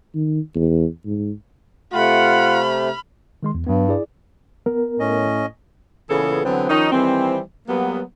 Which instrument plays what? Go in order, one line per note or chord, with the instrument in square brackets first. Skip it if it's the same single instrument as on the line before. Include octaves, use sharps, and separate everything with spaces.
[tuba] D#3
E2
G#2
[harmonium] C3 A3 [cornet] F4 [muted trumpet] F#5 [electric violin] B5 F6
[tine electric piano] D#3 G#3 C6
E2
[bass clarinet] G2 [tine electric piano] F#3 B3
[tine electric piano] E4 G#4 D5
[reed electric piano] B3 A#4
[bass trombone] A2 [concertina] C#4 D#5
[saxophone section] A#2 C#3 E3 B3 G#4 A4
D3 E3 F#3 B3 C4 D4
D#3 F3 C#4 D#4
D#3 E3 G3 C4
F#3 G3 A#3 B3